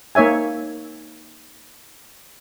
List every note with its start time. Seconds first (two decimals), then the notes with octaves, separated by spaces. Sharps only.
0.15 A#3 D#4 C#5 E5 G#5